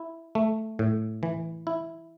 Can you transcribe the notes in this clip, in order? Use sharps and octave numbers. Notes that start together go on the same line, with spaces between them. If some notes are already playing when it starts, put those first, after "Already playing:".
Already playing: E4
A3
A2
E3
E4